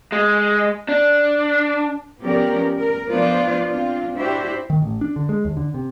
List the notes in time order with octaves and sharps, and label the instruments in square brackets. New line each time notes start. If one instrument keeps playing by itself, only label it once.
[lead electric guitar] G#3
D4
[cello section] F3 B3 C#4 G4 A#4 D5
A#4
F3 B3 D4 F4 C5 D5
C4 D4 F4
D4 E4 F#4 G4 C5 E5
[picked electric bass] D#3
A1
D4
D3
G#3
D#2
D3
C3